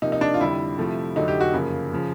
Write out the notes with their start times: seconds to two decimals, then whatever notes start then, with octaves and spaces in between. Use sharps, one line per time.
0.02 C3 F3 A#3 D#4
0.12 D#4
0.21 D4
0.34 F4
0.40 F2 D3 G3 E4
0.77 C3 F3 A3
1.16 F2 D3 F#3 A3 D#4
1.28 G4
1.41 F#4
1.53 F#2 C#3 F3 A#3
1.93 C#3 F3